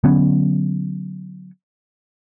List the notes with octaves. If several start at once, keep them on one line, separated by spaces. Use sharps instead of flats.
D3 F#3 B3 C#4